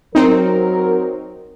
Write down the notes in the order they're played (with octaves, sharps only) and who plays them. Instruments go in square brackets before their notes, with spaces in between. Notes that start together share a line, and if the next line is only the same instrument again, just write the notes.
[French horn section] F#3 A#4 [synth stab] C4 D#4